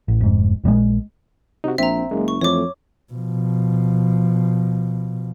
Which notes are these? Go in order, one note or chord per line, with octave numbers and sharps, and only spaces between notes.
A1
F1 G#2
A#1 G2 A#2 G#3
C3 D#4 F#4
A#1 C4 E5 A#5
F#1 G#3 A#3
C#6
F2 E3 A3 C#5 D6
B2 F3